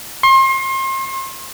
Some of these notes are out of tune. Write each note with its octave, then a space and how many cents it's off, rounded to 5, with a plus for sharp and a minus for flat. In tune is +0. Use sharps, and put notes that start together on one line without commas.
C6 +35